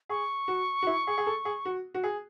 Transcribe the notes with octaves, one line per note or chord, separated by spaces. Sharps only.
G#4 C#6
F#4
F#4
E4
G#4
G#4
A4
G#4
F#4
F#4
G#4